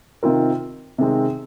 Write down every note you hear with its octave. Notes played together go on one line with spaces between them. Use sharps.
C3 D#3 C4 F4 A#4
C3 D#3 G#3 C4